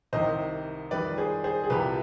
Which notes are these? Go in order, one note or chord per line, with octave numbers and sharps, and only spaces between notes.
C2 C3 D#3 C5 D#5
F2 D#3 G3 B4 D5
G#4 C5
G#4 C5
G#4
C2 C3 F3 G4 B4